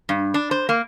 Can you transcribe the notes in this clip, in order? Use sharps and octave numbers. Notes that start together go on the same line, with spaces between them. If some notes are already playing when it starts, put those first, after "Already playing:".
G2
D4
C5
A#3